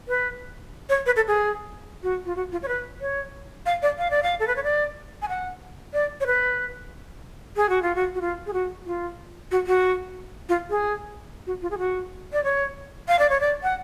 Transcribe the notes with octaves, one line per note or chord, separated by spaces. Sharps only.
B4
C#5
B4
A4
G#4
F#4
F4
F#4
F4
C#5
B4
C#5
F5
D5
F5
D5
F5
A4
B4
C#5
D5
G#5
F#5
D5
C#5
B4
G#4
F#4
F4
F#4
F#4
F4
G#4
F#4
F4
F#4
F#4
F4
G#4
F#4
F4
G#4
F#4
D5
C#5
F5
D5
C#5
D5
F#5